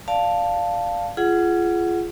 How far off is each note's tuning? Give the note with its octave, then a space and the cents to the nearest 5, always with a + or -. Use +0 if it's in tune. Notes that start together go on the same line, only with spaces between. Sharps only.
D5 +0 F5 +0 A5 +0
F4 -20 G#4 +15 F#5 +0